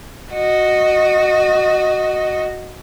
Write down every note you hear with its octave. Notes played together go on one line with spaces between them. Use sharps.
F#4 D#5